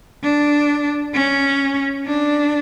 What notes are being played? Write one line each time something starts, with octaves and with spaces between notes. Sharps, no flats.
D4
C#4
D4